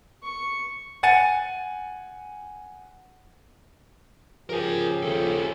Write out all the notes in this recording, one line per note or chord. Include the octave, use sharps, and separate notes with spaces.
C#6
F#5 G#5 A6 C#7 D#7
C#3 F3 G4 G#4 A#4 G#5
D#2 F3 A4